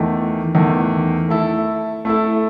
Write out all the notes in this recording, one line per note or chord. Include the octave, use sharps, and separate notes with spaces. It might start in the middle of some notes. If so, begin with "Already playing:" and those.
Already playing: E2 D#3 A3
E2 D#3 A3
A3 E4 A4
A3 E4 A4